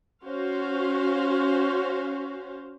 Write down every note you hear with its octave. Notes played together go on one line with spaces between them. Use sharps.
C#4 F#4 C5 F5